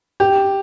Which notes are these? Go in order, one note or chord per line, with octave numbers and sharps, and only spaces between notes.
G4